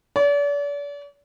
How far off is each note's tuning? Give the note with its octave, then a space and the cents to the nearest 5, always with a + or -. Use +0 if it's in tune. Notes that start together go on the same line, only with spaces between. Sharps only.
D5 -40